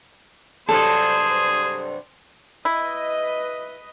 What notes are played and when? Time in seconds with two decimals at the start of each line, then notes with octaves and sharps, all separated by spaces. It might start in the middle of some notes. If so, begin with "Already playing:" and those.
0.69 G2 C3 F#3 G#4 A4 C5
2.65 E4 B4 D#5